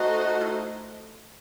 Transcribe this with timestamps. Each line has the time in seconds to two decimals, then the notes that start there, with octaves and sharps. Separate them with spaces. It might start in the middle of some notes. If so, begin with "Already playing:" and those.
Already playing: A3 D#4 F#4 A4 C5 D#5
0.41 E4
0.50 F#4